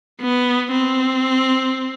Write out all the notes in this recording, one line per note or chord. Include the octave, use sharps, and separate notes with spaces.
B3
C4